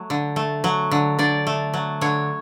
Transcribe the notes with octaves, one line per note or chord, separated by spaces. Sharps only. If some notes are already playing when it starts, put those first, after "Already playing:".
Already playing: F#3 A3
D3
A3
F#3
D3
D3 D5
A3
F#3
D3 C#5